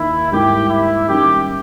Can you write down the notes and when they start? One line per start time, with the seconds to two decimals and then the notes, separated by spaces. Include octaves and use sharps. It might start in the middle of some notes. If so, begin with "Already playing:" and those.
Already playing: D#2 D#3 A#3 D#4 E4
0.32 G#2 G3 A#3 E4 G4
0.70 E4
1.08 D#3 G3 A#3 C#4 G4